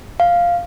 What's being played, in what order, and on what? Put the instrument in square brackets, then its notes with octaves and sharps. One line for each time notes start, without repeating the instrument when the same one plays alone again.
[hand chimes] F5